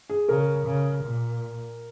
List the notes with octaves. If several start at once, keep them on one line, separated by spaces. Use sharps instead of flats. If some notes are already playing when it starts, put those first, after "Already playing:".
G#4
C#3 A#4
C#3
A#2